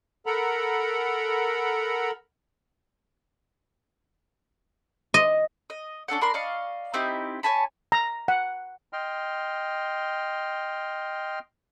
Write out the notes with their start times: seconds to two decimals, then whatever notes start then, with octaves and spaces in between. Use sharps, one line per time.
0.26 A4 A#4 F#5 A#5 B5
5.14 D#5
5.70 D#5
6.08 C#4 D4 A4 F#5
6.21 D4 A#4 B5 C6
6.34 D5 D#5 F5 C#6
6.94 C4 D#4 E4 G4
7.43 C#5 G#5 A5 B5
7.92 A#5
8.28 F#5
8.93 D#5 G5 C6 F6